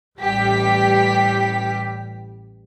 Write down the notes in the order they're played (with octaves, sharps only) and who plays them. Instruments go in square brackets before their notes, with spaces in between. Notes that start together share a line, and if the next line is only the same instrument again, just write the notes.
[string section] A1 G3 G4 B6